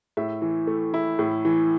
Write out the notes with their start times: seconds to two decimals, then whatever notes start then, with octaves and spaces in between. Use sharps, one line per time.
0.17 A2 E5
0.42 E3
0.67 A3
0.94 E4
1.19 A2
1.45 E3